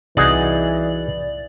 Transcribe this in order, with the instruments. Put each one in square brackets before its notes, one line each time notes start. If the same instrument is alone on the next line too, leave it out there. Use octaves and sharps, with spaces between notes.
[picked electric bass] C2 C3 [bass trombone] E3 [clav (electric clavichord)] D#4 F#4 G#4 [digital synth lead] D5